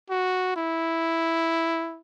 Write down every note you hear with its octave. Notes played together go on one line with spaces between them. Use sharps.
F#4
E4